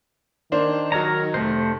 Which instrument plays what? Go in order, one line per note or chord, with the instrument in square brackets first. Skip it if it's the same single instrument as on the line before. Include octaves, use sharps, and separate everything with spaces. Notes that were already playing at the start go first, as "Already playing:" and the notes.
[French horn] D#3 [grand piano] A#3 D4 C5
[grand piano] F#3 D#4 [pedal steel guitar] A#4 C#5 A#5
[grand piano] F1 [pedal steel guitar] A3 C5